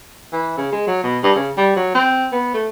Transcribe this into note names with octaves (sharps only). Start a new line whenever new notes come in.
E3
C#3
G#3
F#3
B2
G2
C#3
G3
F#3
C4
B3
A3